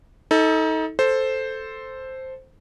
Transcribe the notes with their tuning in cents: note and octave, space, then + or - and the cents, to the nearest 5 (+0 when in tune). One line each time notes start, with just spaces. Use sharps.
D#4 +30 A4 +0
A4 +0 C5 +0